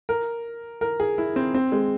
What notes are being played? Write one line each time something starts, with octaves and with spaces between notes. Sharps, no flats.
A#4
A#4
G#4
E4
C4
C4
G#3